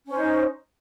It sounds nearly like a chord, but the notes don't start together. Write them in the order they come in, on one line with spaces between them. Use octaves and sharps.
C#4 C5 D#4